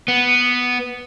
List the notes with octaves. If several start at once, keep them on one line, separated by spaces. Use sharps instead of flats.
B3